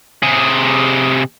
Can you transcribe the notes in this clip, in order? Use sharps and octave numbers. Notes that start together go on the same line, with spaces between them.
C3 G#4